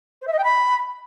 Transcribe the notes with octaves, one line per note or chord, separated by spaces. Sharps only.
C5
E5
D#5
G5
B5